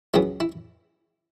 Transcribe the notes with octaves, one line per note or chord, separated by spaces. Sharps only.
C#2 C#3 F#3 B3 E4
E4